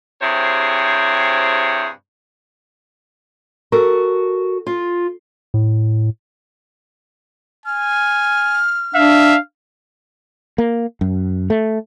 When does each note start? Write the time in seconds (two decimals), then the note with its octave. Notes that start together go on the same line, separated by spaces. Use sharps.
0.22 G2 C3 E4 G#4 C5 C#5
3.72 F#4 A4 A#4
4.67 F4
5.54 A2
7.66 G#5 F6
8.95 D4 E5 F5
10.58 A#3
11.01 F#2
11.50 A3